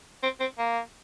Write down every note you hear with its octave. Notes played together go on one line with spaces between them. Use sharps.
C4
C4
A#3